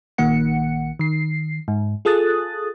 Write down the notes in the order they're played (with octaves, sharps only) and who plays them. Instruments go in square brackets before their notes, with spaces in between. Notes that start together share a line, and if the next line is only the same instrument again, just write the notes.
[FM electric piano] A#1 D#3 A#3 F#5 C#7
D#3 C7
G#2
F4 G#4 A4 D#6 F#6 A6